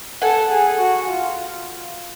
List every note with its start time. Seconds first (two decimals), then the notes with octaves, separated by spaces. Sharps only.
0.22 A4 F#5 G#5
0.50 G#4
0.79 F#4
1.08 F4